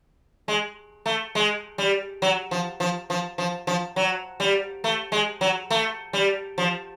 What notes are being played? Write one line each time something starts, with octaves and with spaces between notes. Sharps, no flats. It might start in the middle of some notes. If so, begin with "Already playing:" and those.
G#3
A3
G#3
G3
F#3
F3
F3
F3
F3
F3
F#3
G3
A3
G#3
F#3
A3
G3
F3